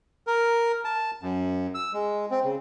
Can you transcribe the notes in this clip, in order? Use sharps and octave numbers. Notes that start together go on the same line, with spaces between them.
A#4
A5
F#2
E6
G#3
C4
C#3